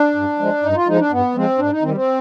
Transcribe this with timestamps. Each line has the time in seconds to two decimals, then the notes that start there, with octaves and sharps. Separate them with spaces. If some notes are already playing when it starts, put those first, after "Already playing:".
Already playing: D4
0.15 G2
0.39 F3 G#3
0.63 G2 D#4
0.75 F4
0.87 F3 G#3 D#4
0.99 D4
1.11 G2 B3
1.35 F3 G#3 C4
1.58 G#2 D4
1.71 D#4
1.82 D#3 G3 C4
1.94 C4